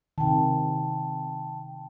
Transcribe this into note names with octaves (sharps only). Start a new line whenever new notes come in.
C3 D#3 G5 A5